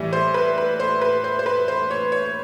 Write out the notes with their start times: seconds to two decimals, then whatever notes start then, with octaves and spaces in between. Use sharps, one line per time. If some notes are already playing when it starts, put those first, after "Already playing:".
Already playing: A2 E3 G3
0.13 C5
0.34 B4
0.58 B4
0.80 C5
1.01 B4
1.24 C5
1.39 C5
1.46 B4
1.68 C5
1.91 C#5
2.12 C#5